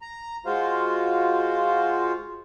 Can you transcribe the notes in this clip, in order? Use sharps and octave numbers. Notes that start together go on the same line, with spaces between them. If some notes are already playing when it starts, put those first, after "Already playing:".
A#5
G#3 F4 F#4 C5 F5